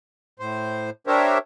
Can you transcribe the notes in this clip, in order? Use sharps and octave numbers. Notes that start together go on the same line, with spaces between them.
A2 C5
D4 G4 A#4 C5 C#5 E5